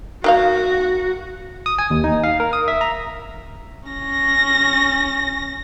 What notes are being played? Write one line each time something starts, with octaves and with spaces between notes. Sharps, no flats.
D#3 A#3 F#4 F5
D#6
G#5
D#2
D#4
F5
A#4
D#6
E5
A#5
C#4 A#6